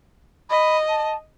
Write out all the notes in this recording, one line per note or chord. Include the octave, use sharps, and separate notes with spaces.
D#5 B5
A5